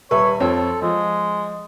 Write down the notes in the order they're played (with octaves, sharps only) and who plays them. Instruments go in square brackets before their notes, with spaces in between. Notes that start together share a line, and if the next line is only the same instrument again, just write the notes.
[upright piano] D#1 B4 E5 [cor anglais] C#5
[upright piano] F2 C4 C#5 [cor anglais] A4
[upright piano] F3 [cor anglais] G#3